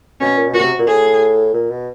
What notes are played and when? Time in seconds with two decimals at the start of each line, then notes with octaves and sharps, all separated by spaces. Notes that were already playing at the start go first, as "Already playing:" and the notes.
0.20 B2 C#4
0.37 A#2
0.48 B2
0.54 A#2 F#4
0.62 C3
0.79 A#2
0.86 A2 G#4
1.54 A#2
1.70 B2